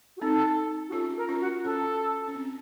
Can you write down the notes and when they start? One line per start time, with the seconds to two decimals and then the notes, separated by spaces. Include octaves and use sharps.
0.17 F#4
0.21 C4 D#4 A4
0.89 F#4
0.92 C#4 F4 A4
1.17 A#4
1.29 C#4 F4
1.40 F#4
1.64 C#4 A4
2.28 C#4
2.36 C4